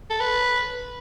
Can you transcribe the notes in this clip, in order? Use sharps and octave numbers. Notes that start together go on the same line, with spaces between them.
A4
B4